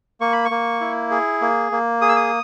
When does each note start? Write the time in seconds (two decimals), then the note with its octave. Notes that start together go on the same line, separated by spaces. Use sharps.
0.21 A#3 C#6
0.33 B5
0.45 C#6
0.51 A#3
0.81 E4
1.11 G#4
1.41 A#3
1.72 A#3
2.01 G#4 D#6
2.09 E6
2.16 D#6